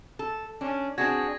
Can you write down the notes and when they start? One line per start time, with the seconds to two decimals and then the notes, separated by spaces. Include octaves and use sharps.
0.19 A4
0.61 C#4 D4
0.98 C4 D4 F#4 G#4 G#6 A#6